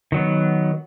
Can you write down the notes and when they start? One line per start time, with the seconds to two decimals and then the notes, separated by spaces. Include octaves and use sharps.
0.12 D#3 F#3 B3